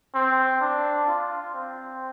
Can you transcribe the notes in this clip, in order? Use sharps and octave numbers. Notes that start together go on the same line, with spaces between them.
C4
D4
F4
C4